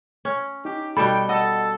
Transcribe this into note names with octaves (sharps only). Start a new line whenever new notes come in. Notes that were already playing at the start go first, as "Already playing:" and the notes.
C#4
D#4 G4
B2 G3 A4 G5 B5
A4 D#5 F#5